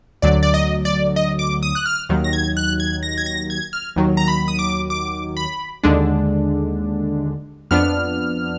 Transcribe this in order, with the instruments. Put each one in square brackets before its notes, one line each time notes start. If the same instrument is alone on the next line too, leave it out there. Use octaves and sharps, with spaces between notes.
[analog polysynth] D2 D3 F#3 D5
D5
D#5
D5
D#5
D6
D#6
F#6
F6
D#2 D#3 F#3
A#6
G#6
F#6
G#6
A#6
G#6
A#6
G#6
F6
D#2 D#3 F#3
A#5
B5
D#6
D6
D6
B5
D#2 D3 G#3 D4
F2 F3 B3 D4 F6